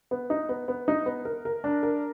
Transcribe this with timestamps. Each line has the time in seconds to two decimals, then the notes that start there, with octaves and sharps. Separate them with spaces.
0.11 B3
0.30 D#4
0.49 B3
0.68 B3
0.88 D#4
1.06 B3
1.25 A#4
1.45 A#4
1.64 D4
1.83 A#4